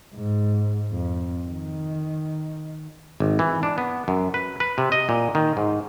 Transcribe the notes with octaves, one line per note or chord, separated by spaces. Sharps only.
G#2
F2
D#3
G#1
E3
D4
B3
F#2
B4
B4
C3
D#5
A#2
D#3
G#2